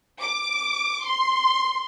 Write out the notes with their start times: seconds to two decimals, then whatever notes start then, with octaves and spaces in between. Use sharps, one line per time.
0.21 D6
1.03 C6